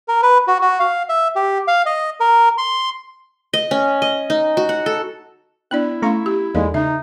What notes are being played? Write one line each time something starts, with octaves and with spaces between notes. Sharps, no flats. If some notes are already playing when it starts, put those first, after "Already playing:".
A#4
B4
F#4
F#4
F5
E5
G4
F5
D#5
A#4
C6
D#5
C#4
D#5
D#4
F#4
F#5
A4
B3 D4 E4 D5 F#6
A3 C#4 F5 A#5 C6 C#6
G4
E2 G#3 A#3 D#4 A4 D5 F5
C#3 D#4 E5 A#5